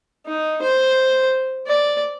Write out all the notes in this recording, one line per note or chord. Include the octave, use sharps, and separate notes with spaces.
D#4
C5
D5